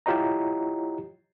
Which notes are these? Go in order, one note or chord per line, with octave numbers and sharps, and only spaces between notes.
E4 F4 G4 C#5 D#5 A#5